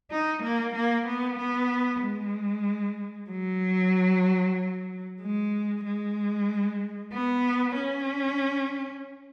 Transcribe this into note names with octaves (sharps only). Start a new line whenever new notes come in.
D#4
A#3
A#3
B3
B3
G#3
F#3
G#3
G#3
B3
C#4